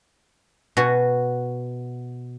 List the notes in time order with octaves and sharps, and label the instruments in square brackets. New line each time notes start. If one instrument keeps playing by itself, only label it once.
[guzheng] B2 F#4 G#5